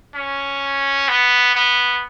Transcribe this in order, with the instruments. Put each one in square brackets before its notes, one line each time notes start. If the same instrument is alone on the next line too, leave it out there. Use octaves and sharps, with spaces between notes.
[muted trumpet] C#4
B3
B3